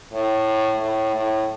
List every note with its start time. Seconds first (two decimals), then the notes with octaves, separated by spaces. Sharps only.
0.14 A2
0.81 A2
1.15 A2